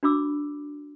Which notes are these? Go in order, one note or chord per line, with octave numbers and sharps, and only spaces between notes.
D4 F#4 B5 D6 E6